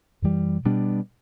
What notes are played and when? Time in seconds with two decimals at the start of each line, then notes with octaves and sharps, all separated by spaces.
0.22 F#2 E3 G3
0.65 B2 G3 B3 D4